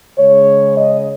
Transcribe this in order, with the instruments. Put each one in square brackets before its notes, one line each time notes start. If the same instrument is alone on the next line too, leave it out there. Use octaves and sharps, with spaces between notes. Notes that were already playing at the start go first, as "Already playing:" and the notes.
[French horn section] C#3 G#3 C#5
D#5